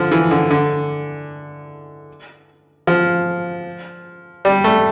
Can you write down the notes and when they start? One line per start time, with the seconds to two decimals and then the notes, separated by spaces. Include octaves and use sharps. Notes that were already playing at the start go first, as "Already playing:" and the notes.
Already playing: D3 F3
0.12 E3
0.31 D3
0.51 D3
2.87 F3
4.45 G3
4.64 A3